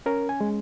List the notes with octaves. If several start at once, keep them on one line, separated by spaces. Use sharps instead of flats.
C#4 A#4
G#5
G#3